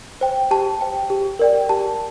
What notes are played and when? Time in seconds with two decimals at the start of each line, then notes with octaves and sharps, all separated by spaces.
0.21 C5 G5
0.51 G4 A5
0.81 C5 G5
1.10 G4
1.39 A#4 D5 G5
1.69 G4 A5